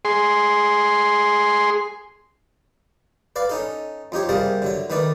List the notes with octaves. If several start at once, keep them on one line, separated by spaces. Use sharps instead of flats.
G#4 C6
B4 D5 F5
C#4 D#4 A4
F2 D#4 G4 C#5
C3 G3 A#3 G#4 A#4 A5
D3 F#3 E5
D#3 A3 D#4 B4 D5